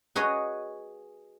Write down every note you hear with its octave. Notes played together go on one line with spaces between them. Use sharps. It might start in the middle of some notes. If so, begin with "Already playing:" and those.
F#4 G#4 B4 C#5 D#5